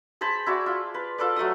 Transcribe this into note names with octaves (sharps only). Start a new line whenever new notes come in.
G#4 C5 A5 B5
E4 F#4 D5
F4
B4
F4 A4 B4 D5
F#3 A3 F#5 D#6